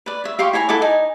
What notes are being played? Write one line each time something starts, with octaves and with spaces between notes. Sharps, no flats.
B4 D5
C#5 E5
G4 F5 C6 C#6
E4 C#5 G#5 A#5
E4 A4 F#5 D6
D#4 G#5